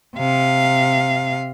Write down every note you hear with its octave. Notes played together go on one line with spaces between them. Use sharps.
C3 F5